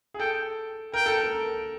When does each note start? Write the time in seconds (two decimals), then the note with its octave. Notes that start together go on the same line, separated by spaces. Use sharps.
0.14 G#4
0.19 A4 G5
0.94 A#4 G5
1.06 A4
1.17 A#4